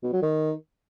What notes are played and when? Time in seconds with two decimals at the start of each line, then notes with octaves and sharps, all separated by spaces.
0.03 B2
0.13 F#3
0.22 D#3